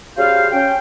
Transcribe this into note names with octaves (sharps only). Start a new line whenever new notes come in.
G3 C#4 F#4 G#4 C5 F5
C#4 G5